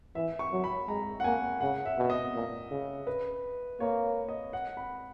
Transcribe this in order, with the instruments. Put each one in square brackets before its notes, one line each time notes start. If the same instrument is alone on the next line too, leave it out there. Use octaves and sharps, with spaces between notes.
[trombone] E3 [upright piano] E5
[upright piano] C#6
[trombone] F#3
[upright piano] B5
[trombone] G#3 [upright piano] A#5
[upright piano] F#5
[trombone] A#3 [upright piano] G#5
[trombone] C#3 [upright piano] F#5
[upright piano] E5
[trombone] B2
[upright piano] D#5
[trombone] A#2
C#3
[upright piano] B4
[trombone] A#3 [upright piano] C#5
[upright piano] D#5
F#5
B5